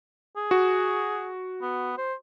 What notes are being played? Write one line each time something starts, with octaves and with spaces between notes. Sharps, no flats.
G#4
F#4
B3
C5